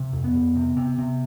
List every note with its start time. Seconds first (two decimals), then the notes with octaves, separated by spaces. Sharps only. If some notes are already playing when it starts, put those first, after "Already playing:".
Already playing: C3
0.13 F2
0.24 B3
0.34 F2
0.56 C3
0.77 C3
0.98 C3